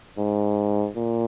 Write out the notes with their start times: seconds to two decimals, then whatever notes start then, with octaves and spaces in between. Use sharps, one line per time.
0.18 G#2
0.96 A#2